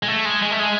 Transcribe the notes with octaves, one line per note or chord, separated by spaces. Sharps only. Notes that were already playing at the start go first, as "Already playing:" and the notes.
G#3
A3
G#3
G#3
A3
G#3